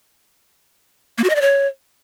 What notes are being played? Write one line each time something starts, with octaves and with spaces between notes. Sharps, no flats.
A#3
F#4
D#5
D5
C#5